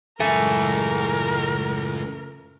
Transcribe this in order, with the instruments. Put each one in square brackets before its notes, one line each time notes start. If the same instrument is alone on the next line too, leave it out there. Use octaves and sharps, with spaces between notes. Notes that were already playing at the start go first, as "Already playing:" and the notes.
[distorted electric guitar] C#2 G#5 [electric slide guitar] F#2 A2 E3 [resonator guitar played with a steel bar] A3 [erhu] A#4